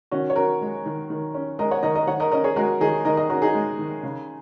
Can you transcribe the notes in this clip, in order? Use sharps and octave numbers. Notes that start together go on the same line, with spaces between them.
D#3 C#4 F#4
C#5
C#4 F#4 A#4
G#3
D#3
D#3
C#4
G#3 A#4 D#5
C#5 F#5
D#3 A#4 D#5
A#4 D#5
D#3 C#5 F#5
A#4 D#5
C#4 A#4 D#5
G#4 C#5
G#3 F#4 A#4
D#3 D#4 G#4
D#3 A#4 D#5
A#4 D#5
C#4 F#4 A#4
D#4 G#4
G#3
D#3
C#3